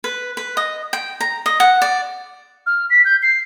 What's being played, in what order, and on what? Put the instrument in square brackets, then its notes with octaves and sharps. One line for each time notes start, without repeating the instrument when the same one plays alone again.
[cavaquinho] B4
B4
D#5
G5
A#5
D#5
F#5
D5
[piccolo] F6
B6
G6
C7